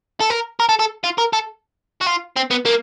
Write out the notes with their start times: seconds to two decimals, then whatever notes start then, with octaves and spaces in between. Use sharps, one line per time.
0.20 A4
0.30 A#4
0.60 A#4
0.69 A4
0.79 A4
1.04 F4
1.18 A#4
1.33 A4
2.01 F#4
2.07 F4
2.36 C4
2.51 B3
2.65 A#3